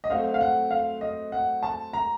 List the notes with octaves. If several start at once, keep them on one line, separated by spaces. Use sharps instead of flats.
D#5
F#3 A3 C4 F#4 C5 F5
F5
F#5
F5
D#5
F#5
A5
A#5